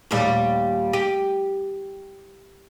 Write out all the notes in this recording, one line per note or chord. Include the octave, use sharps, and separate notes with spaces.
D#2 A#2 G3
G4